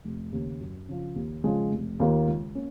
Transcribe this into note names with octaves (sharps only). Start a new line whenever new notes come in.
F1
D#2 C#3
F#2
C#3 F3
D#2
C#3 F3 G#3
F1
D#2 D#3 A#3 F4
C#2
A#3 C#4